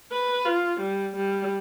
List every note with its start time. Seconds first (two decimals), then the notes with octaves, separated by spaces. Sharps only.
0.12 B4
0.46 F4
0.80 G3
1.16 G3